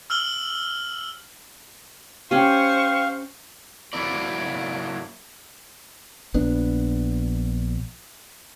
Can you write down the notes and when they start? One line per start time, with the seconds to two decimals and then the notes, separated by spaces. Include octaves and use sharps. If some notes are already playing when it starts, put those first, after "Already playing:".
0.10 E6 F6 F#7 G7
2.31 C#4 G4 C5 F5 G5 C#6 D#7
3.93 F#3 A#3 E4 D5
6.34 A#1 B3 D4